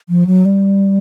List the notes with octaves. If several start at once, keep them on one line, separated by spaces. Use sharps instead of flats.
F3
F#3
G3